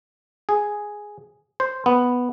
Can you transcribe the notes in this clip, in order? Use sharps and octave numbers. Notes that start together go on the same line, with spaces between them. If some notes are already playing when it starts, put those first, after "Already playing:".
G#4
C5
B3